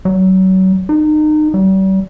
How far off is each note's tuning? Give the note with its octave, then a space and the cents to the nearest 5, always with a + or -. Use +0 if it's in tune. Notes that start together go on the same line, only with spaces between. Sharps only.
F#3 +30
D#4 -30
G3 -40